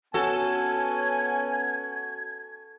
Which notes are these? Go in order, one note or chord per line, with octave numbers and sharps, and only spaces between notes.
B3 C#4 F#4 A4 G#5 G#6